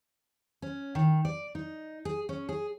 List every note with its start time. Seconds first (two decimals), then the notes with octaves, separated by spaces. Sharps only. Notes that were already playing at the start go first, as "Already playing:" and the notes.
0.62 C#4
0.95 D#3
1.25 D5
1.55 D#4
2.05 G#4
2.29 C#4
2.49 G#4